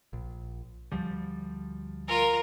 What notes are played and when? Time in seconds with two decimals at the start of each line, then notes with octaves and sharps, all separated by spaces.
0.13 A#1
0.92 D2 F3 G3
2.08 F4 A#4